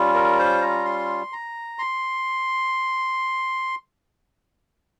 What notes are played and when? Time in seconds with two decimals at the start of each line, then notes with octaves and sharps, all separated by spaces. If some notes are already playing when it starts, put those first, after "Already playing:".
Already playing: G3 C#4 F4
0.14 A#4
0.39 C5
0.61 A#5
0.85 C6
1.33 A#5
1.79 C6